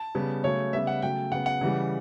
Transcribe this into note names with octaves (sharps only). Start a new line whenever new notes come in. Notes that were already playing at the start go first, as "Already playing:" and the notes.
Already playing: A5
C#3 G3 B3
C#3 F#3 A3 C#5
C#3 G3 B3 E5
F#5
C#3 F#3 A3 G5
C#3 F#3 B3 F#5
F#5
C#3 E3 G3